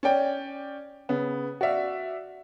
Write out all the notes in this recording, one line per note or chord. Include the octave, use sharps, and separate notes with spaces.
C#4 D5 G5
C#3 B3
F#4 D5 E5 F5